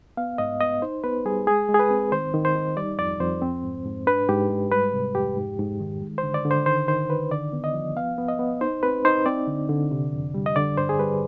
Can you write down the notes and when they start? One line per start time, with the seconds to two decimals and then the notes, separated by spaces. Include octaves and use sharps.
0.17 B3 F5
0.38 G#2 D#5
0.60 B3 D#5
0.82 D#4 C5
1.04 B3 B4
1.25 G3 G#4
1.47 G#3 G#4
1.69 G#3
1.74 G#4
1.80 B4
1.91 C4
2.12 D#3 C5
2.34 D#3
2.45 C5
2.55 D#4
2.77 G3 D5
2.98 F2 D5
3.20 F2 C5
3.42 C4
3.63 G#2
3.85 G#2
4.07 D4 B4
4.28 G#2 G4
4.50 G#3
4.71 G3 B4
4.93 C3
5.15 F2 G4
5.37 G#2
5.59 G#2
5.80 D#3
6.01 G#3
6.18 C5
6.23 D3
6.34 D5
6.45 D3
6.51 C5
6.66 D#3 C5
6.88 D#3 C5
7.10 D#3 B4
7.31 D3 D5
7.53 B3
7.64 D#5
7.74 F3
7.96 B3 F5
8.18 B3
8.28 D#5
8.39 B3
8.61 D#4 C5
8.83 C4 B4
9.05 D#4 C5
9.26 C4 D5
9.47 D3
9.69 D3
9.91 C3
10.13 F2
10.34 G3
10.46 D#5
10.56 D3 D5
10.77 G2 C5
10.89 G#4
10.99 G3 B4